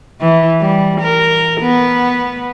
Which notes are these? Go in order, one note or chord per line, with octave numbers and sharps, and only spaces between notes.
E3
G3
A#4
B3